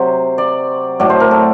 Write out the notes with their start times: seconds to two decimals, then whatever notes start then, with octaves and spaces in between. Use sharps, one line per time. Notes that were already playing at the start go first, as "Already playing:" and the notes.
Already playing: C3 F#3 C5
0.38 D5
1.00 A2 F#3 D5
1.10 C5
1.20 A#4
1.31 A4